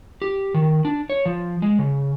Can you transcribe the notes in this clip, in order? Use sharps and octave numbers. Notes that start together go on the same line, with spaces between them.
G4
D#3
D4
C#5
F3
G#3
C#3